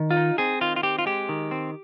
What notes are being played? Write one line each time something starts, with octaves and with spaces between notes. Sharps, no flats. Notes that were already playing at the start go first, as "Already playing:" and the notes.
Already playing: D#3
F4
D#4
C4 G#4
D#3 F4
F4
C4 G4
F4
G#3 G4
D#3
C4